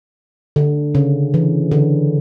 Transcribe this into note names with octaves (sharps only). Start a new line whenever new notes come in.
D3
C#3
E3
D3